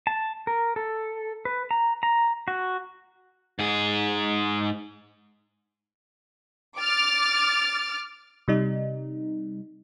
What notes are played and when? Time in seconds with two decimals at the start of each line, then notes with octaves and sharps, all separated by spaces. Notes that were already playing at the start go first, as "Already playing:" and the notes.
0.07 A5
0.47 A#4
0.76 A4
1.45 B4
1.71 A#5
2.03 A#5
2.48 F#4
3.59 G#2 G#4
6.79 D6 F6 A6
8.48 C3 G3 D#4